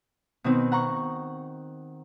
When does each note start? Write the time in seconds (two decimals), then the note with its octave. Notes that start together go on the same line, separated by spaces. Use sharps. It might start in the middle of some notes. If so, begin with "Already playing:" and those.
0.44 B2 D#3 C4
0.72 F#5 A#5 C#6